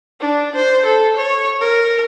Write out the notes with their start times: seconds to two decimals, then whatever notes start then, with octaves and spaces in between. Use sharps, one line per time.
0.20 D4
0.55 C5
0.85 A4
1.16 C#5
1.61 A#4